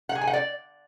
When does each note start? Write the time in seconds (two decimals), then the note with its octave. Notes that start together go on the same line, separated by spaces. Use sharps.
0.09 F#5
0.15 G#4
0.21 G#5
0.27 F#5
0.33 D5